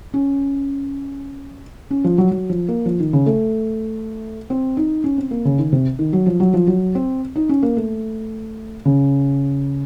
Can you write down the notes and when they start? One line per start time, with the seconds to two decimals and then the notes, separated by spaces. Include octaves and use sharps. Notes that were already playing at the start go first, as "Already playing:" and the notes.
0.14 C#4
1.91 C#4
2.04 F3
2.18 F#3
2.31 F#3
2.50 F3
2.68 A#3
2.86 F3
3.00 D#3
3.13 C#3
3.26 A3
4.50 C4
4.77 D#4
5.04 C#4
5.18 C4
5.31 A#3
5.45 C#3
5.58 D#3
5.72 C3
5.99 D#3
6.13 F#3
6.26 F3
6.40 F#3
6.54 F3
6.67 F#3
6.95 C4
7.36 D#4
7.49 C#4
7.63 A#3
7.77 A3
8.85 C#3